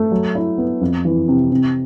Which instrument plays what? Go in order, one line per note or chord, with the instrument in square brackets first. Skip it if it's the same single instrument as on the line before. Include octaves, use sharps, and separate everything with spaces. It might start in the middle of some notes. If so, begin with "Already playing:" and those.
Already playing: [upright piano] A3
F#3
E4
B3
F2
E3
C3
C3